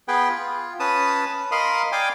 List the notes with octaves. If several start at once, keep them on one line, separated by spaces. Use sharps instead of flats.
B3 G#4 B4 G5
F4
C#4 B4 A5 D#6
A#4 D#5 F5 B5 C6
D5 F5 G5 G#5 D6